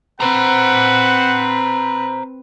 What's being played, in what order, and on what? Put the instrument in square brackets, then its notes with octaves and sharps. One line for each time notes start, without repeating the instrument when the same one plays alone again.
[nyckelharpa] C4 B4 [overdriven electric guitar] C5 A#5 [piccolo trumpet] F#5